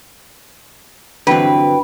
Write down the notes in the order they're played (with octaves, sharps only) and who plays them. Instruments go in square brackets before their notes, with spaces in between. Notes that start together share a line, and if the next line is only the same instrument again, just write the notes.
[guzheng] G2 E3 [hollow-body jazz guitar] D3 F#3 C4 [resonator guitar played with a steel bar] B4 [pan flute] G5